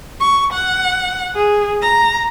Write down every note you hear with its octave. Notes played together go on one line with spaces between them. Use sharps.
C#6
F#5
G#4
A#5